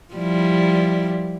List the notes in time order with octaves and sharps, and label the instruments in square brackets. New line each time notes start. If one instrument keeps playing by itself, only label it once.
[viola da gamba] F3 G3 E4